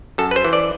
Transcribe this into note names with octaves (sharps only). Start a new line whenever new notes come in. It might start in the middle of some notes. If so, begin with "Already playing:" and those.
F#2 A4
B4
C5
E3
D5